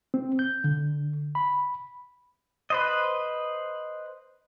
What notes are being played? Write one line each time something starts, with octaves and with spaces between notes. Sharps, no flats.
C4
G6
D3
B5
B4 C5 D#5